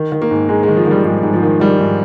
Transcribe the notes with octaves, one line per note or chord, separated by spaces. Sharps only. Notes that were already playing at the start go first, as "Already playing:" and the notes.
Already playing: D#3
D#3
A#3
G#2
G#2 G#3
G#3
D#3
F3
D#3 G3
G#2 G3
G#2
F3
D#3
D#3 G3
G#2